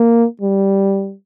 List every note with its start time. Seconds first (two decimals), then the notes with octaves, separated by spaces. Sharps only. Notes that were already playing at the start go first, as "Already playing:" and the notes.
Already playing: A#3
0.41 G3